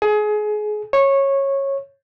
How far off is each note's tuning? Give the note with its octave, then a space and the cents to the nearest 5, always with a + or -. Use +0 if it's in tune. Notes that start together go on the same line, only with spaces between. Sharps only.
G#4 +25
C#5 -15